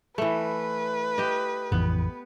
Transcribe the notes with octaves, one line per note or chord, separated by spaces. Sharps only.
E3 A3 B4
G4 D#5
A1 F2 E3 B3